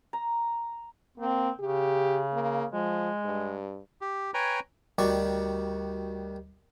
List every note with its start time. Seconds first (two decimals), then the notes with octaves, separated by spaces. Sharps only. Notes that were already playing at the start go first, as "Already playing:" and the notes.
0.13 A#5
1.18 A#3 C4
1.60 C#3 G4
2.33 A#3
2.73 F3 G#3
3.25 G2
4.01 G4
4.34 B4 C#5 G5 G#5 A#5
4.98 D2 D#3 G3 F#4 D5 C#6